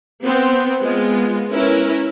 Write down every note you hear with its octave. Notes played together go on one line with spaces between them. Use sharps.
B3 C4
G#3 B3 F4
C#4 E4 A#4 B4